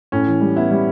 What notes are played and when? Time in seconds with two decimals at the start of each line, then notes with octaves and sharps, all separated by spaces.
0.12 A2 C#4
0.27 E3
0.41 G3
0.56 B3 E4
0.71 G3